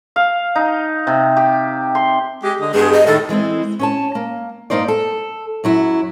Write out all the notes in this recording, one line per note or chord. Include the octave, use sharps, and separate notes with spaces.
F5
D#4
C3
G4
C6
G#3 G4
D3 D#5
G2 G#3 B3 G#4
D#5
A2 D#3 A4
E3 G#3 C4 E4
C#4 C#5 A5
A#3
G2 C#3 A#3 D#4 C5 D5
A4
F#2 F#3 E4